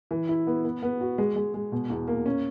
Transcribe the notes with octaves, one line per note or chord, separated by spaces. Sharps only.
E3
E4
B3
B3
B3
F#4
G#3
G#3
G#3
B2
E2
A#3
C#4